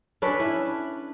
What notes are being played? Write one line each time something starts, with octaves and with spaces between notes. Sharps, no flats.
C#4 D4 A4 B4
E4